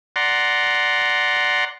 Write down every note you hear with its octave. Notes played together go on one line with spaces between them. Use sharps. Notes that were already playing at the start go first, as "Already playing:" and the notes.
D5 F#5 A#5 C6